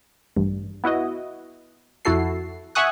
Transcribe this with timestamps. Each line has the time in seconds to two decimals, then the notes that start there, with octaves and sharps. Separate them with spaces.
0.36 A1 G2
0.84 B3 E4 F#4 D#5
2.05 F2 E4 F#4 A4 C7
2.75 E5 F#5 G#5 C#6 D#6 F#6